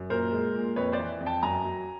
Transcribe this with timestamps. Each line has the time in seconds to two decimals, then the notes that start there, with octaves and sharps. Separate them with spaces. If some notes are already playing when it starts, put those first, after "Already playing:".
Already playing: F#2
0.10 A#2 A#4 C5
0.32 G#3
0.54 A#2
0.76 F2 B4 C#5
0.92 C5 D5
0.99 E3
1.20 F2
1.26 G5 A5
1.43 F#2 G#5 A#5
1.65 F#3